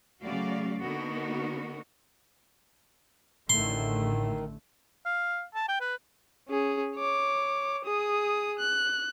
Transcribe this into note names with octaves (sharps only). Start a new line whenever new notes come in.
C#3 F#3 A3 F#4 D5 F5
D3 A#3 B3 D#4 F#4 A#4
A1 A2 D3 D#3 A3 C6
F5
A5
G5
B4
C#4 G#4
C#5 D6
G#4 D#6
F#6